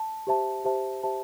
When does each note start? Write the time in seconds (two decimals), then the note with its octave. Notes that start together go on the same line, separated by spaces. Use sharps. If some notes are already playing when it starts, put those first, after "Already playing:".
Already playing: A5
0.27 G4 C5 E5 A5
0.65 G4 C5 E5 A5
1.03 G4 C5 E5 A5